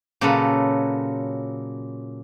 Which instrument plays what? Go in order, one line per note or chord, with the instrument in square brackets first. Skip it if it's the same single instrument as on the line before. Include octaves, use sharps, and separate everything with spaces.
[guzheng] A#2 C#3 F#3 A4 B4